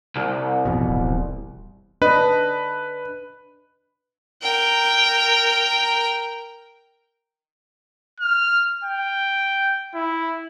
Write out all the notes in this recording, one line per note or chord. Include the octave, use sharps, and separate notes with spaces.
C2
A1 F2 B2
D1
D4 B4 D#5
A#4 G5
F6
G5
E4